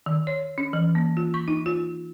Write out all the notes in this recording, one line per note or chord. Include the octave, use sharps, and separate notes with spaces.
D#3
C#5
C#4
E3
A#3
F4
C#6
D#4
F4